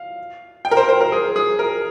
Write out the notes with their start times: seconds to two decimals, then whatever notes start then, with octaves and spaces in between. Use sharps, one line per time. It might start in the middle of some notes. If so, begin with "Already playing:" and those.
Already playing: F5
0.65 G5
0.71 A#4
0.77 C5
0.89 C5
1.01 A#4
1.12 G#4
1.36 G#4
1.59 A#4